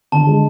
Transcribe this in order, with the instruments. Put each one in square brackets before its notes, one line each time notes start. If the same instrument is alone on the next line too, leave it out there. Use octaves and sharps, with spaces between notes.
[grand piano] D3 [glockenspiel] A5
[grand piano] G#3